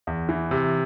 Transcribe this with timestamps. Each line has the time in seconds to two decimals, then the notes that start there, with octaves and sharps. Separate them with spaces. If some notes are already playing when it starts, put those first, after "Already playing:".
0.07 E2
0.29 E3
0.51 C3